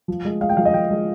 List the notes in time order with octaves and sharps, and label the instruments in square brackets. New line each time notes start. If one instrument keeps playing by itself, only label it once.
[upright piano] F3
G#3
G#3 F5
G5
F3 F5
D#5
F3 G5
G#3